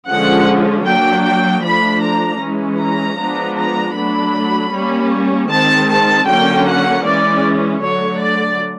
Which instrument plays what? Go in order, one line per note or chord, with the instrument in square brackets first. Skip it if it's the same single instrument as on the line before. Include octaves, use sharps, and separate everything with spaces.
[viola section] D3 F3 G#3 C#4 F#5
F#3 A#3 D4 G5
G5
F3 A3 D4 B5
A#5
E3 G#3 C#4
A#5
F3 G#3 B3 D4
A#5
F#3 A3 D4 B5
G3 A#3 C#4
D#3 G#3 C4 A5
A5
D3 F#3 A#3 C#4 G5
F#5
E3 G#3 C#4 D5
D3 F#3 A3 C#5
D5